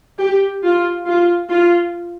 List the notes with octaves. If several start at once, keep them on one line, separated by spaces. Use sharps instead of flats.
G4
F4
F4
F4